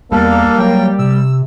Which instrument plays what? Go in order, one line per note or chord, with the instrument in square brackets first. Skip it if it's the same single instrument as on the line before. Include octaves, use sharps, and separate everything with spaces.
[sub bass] E2 [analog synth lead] G3 [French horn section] A#3 [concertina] D4 A4 F5
[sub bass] F#3 [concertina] G5
[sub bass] C3 [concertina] E6